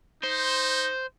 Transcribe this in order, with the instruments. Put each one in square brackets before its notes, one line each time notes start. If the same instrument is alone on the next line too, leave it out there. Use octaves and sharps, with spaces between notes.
[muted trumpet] D#4 [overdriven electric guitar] C5